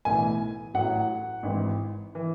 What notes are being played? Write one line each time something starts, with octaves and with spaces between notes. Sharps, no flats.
B1 A2 E3 G#5
A1 A2 F#3 F#5
G#1 G#2 E3
E3